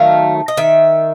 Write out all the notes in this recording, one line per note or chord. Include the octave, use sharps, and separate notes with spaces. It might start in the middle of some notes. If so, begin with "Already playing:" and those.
Already playing: D#3 F#3 A3 F5
D#5
D#3 E5